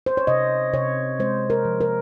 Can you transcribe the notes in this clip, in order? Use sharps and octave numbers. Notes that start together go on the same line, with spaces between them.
C5
C#5
C3 D#5
C3 C#5
G#3 C5
A#4
F3
A#4